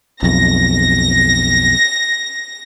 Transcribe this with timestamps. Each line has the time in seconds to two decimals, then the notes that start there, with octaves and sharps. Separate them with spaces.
0.23 B1 F2 A#6